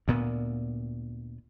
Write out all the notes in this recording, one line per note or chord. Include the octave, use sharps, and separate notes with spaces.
D2 A#2 B3